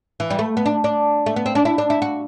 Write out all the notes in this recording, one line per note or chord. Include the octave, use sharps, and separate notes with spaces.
E3
G3
A3
B3
D4
D4
A3
B3
C4
D4
E4
D4
E4
F#4